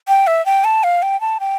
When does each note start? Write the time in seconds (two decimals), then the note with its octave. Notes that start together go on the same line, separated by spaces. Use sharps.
0.08 G5
0.27 E5
0.46 G5
0.64 A5
0.83 F5
1.02 G5
1.21 A5
1.40 G5